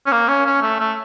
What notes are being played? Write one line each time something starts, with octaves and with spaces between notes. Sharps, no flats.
C#4
A#3
C#4
C#4
A3
A3